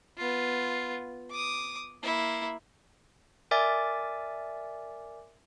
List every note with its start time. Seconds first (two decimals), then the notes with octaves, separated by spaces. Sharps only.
0.17 B3 F4
1.31 D6 D#6
2.03 A#3 E4
3.51 A#4 D5 E5 G#5 D6 A6